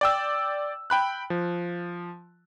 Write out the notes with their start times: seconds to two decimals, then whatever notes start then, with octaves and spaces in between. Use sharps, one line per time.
0.01 D5 G5 E6
0.90 G5 B5 F#6
1.30 F3